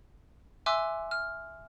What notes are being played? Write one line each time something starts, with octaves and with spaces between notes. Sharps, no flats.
E5 G#5 C6 D6 E6 F#6
F6